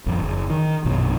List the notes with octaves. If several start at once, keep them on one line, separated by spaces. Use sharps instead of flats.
G#1 F2
F#1
D#3
A#1 F#2 B2 F#3